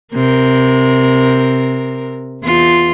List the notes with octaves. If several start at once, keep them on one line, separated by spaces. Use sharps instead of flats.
C3 A#4
E2 F4